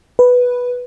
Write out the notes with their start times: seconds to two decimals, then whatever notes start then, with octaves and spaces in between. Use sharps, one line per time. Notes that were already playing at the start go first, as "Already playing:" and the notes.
0.19 B4